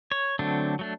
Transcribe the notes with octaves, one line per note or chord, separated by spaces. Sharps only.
C#5
D3 F#3 A3 C4 D4
F#3 A3 D4